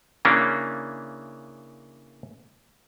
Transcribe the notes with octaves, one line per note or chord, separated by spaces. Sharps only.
C#3 E3 A#3 C#4 D4